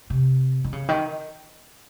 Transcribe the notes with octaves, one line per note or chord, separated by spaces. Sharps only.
C3
D#3
C#3
D#3